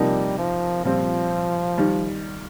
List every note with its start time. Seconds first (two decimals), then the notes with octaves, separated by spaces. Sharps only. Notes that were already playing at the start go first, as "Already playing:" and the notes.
Already playing: C3 F3 G3 A#3 D#4
0.38 F3
0.84 A#2 F3 G3 C4
1.78 D#3 G3